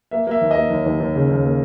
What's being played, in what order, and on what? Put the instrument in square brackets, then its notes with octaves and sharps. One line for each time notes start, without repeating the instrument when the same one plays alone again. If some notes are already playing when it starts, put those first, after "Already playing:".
[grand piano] A#3 E5
A#3 E5
D#2
D#5
A#3
D#2
D#2
D#2
C#3
D#2
A#3